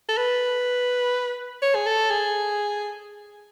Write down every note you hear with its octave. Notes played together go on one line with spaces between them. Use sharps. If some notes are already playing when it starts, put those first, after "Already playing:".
A4
B4
C#5
G#4
A4
G#4